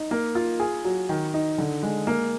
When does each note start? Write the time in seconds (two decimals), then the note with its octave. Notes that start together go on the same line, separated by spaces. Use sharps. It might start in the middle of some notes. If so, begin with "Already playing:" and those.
Already playing: D#4
0.11 A#3
0.35 F4
0.60 G#4
0.84 F#3
1.09 D#3
1.34 D#4
1.58 D3
1.83 G#3
2.07 A#3